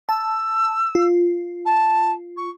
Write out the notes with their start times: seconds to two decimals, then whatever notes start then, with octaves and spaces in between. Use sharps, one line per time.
0.09 A5 E6
0.95 F4
1.65 A5
2.37 C#6